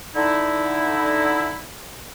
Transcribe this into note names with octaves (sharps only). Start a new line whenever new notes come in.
D3 D#4 E4